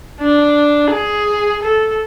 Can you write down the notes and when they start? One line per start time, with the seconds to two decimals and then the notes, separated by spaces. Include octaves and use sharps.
0.21 D4
0.91 G#4
1.63 A4